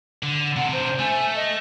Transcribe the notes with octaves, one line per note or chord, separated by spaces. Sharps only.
D3
C3 D4 F#5
C5
A3 G#5
D#5